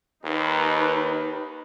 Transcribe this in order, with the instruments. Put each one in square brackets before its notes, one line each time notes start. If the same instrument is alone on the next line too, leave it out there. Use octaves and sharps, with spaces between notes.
[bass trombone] D#2 [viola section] D#4 B4